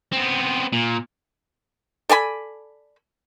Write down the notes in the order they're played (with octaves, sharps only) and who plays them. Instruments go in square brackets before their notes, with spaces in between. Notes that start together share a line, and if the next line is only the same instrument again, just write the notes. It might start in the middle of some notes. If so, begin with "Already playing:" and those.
[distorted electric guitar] B3 C4
A#2
[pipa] A4 D5 G#5 B5